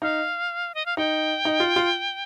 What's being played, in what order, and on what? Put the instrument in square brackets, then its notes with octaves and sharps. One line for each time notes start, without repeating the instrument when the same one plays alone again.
[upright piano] D#4 [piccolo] F5
[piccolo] D#5
F5
[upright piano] D#4 [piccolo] G5
[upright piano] D#4
F4
F4